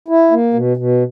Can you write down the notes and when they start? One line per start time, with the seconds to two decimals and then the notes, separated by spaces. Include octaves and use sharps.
0.08 E4
0.31 A#3
0.54 B2
0.77 B2